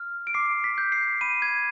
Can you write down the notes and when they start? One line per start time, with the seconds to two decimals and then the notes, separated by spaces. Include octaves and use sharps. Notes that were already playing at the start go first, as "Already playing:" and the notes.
Already playing: F6
0.27 D7
0.34 D6 C7
0.64 B6
0.78 G6
0.92 C7
1.21 B5 D#7
1.42 G#6